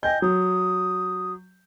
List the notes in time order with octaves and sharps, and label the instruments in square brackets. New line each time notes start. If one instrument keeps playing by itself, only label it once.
[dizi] D#5 [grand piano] G5 G#5 G6
[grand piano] F#3 [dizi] D#6